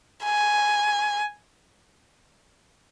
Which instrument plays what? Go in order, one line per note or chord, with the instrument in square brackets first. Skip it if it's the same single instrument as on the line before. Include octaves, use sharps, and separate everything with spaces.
[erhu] G#5